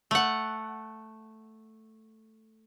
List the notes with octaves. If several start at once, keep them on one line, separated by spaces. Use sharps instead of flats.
A3 F#5